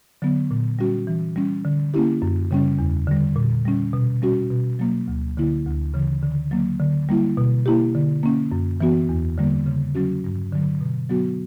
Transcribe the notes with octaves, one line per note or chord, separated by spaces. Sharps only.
D3 F#3 B3
A#2
G3 C#4 F#4
E3
G3 C#4
D3
A#3 C#4 E4 G4
F#2
C#3 G3 C#4
E2
D3 G3
A#2
G3 C#4
B2
G3 C#4 F#4
B2
F#3 A#3
D2
D3 A#3 E4
D2
C#3 E3
D3
F#3 A#3
D3
G3 A#3 E4
B2
A#3 E4 G4
D3
A#3 C#4
F#2
E3 B3 F#4
E2
D3 G3 A#3
C#3
F#3 C#4 F#4
G2
D3 F#3
B2
F#3 B3 F#4